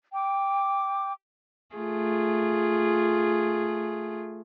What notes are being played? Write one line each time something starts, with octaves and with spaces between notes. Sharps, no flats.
G5 D6
A3 F4 G#4